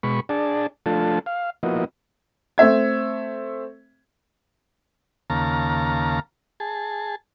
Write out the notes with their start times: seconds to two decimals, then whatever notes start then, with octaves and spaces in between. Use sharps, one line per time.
0.03 B2 G#3 B5 C#6
0.29 D4 G#4 D5 A5
0.86 F3 A3 D4 F4 A4 A5
1.26 F5
1.63 F3 A#3 B3 E4 F#4 D#5
2.58 A3 C4 E5 G#6
5.30 D#2 C#3 A#3 F5 A5 A#5
6.60 G#4 A5